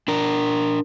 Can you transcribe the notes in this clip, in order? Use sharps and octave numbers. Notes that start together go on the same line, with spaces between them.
D4 A#4